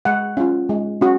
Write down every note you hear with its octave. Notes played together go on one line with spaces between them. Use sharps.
G#3 F#5
C#4 F4
G#3
C#4 F#4